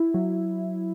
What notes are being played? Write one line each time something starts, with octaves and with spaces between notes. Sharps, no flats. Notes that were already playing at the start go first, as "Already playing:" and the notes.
Already playing: E4
F#3